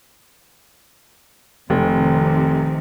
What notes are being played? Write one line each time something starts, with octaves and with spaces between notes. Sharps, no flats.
F1 C3 D#3